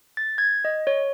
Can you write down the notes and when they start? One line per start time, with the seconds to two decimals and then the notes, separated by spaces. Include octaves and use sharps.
0.17 A6
0.38 G#6
0.65 D#5
0.87 C#5